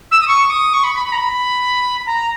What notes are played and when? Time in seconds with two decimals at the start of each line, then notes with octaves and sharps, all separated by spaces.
0.11 E6
0.21 D#6
0.28 C#6
0.50 D#6
0.73 C#6
0.84 B5
0.95 B5
1.06 B5
1.12 A#5
1.17 B5
2.06 A#5